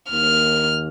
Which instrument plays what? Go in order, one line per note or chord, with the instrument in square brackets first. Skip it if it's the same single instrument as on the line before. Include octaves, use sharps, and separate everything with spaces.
[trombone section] D#2 D#3 A#3 [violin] F6